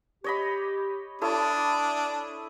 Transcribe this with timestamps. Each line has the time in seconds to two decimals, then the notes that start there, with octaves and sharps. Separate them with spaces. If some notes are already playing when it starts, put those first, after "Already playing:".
0.24 G4 C#5 D#5 B5
1.21 D4 E4 A4 C#5 D6 D#6